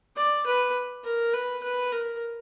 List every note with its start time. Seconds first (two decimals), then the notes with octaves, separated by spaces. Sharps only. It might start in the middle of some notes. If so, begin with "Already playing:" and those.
0.16 D5
0.46 B4
1.04 A#4
1.33 B4
1.63 B4
1.92 A#4